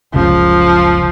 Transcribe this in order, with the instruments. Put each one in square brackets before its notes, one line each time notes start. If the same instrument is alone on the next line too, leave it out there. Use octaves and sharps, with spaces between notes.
[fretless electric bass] F#1 C#2 C#3 [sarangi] F3